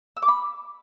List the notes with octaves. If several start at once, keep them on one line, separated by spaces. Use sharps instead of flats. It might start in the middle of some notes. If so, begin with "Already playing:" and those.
E6
D6
B5